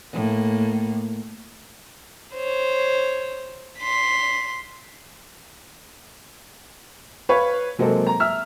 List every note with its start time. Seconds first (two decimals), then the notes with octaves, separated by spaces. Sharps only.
0.13 A2 A#3
2.36 C5 C#5
3.80 C6 B6
7.29 B4 C#5 F5
7.79 C3 F#3 G#3 A#3 C4 A4
8.07 A#5
8.20 E5 E6 F6